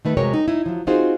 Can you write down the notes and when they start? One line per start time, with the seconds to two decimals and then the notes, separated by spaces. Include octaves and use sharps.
0.05 D#3 A3 B4
0.17 C3 F#3 G#3 A#4 C#5 G5
0.34 D#4
0.48 D#4 E4
0.66 F3 F#3
0.87 C4 D#4 F4 F#4 G#4 C5